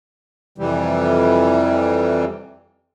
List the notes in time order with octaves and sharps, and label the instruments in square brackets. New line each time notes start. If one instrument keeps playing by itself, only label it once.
[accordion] F2 C3 E3 G3